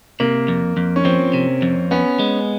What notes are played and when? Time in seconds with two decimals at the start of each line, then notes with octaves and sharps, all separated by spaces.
0.20 C3 A#3
0.48 F2
0.77 F2
0.96 C#4
1.05 F3 C4
1.33 C3
1.62 F2
1.91 B3 C#4
2.19 G#3